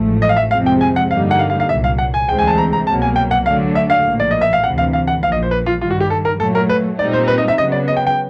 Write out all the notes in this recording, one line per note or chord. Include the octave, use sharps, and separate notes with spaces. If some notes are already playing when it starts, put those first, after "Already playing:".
Already playing: A1 G#2 F3 A3
D#5
F5
E5
F2 C3 F3 G#3 C4 F5
G5
G#5
F#5
G2 D3 G3 A#3 D#4 F5
F#5
F5
F5
F5
C2 A#2 F#3 E5
F5
F#5
G#5
D2 C3 E3 G#3 C4 G5
G#5
A5
A#5
A#5
C2 B2 F#3 A#3 A5
G#5
G5
F#5
D2 D3 F#3 A3 D4 F5
E5
F5
A#1 A2 F3 A#3
D5
D#5
E5
F5
D2 C3 E3 F#5
F5
F5
F#5
A#1 A#2 F3 F5
D#5
C5
B4
F4
G2 D#3 G3 F4
F#4
G4
A4
A#4
A#2 F#3 A3 A4
A#4
B4
A#2 G3 C4 D#4 D5
C5
B4
D#5
E5
C#3 F#3 B3 D#5
D5
D#5
G5
G5